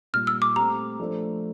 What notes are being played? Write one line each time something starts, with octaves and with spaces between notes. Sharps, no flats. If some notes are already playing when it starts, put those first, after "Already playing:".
A#2 G3 A#3 F6
E6
D6
A3 C4 G4 A#5
F3 A3 D4 A4 C5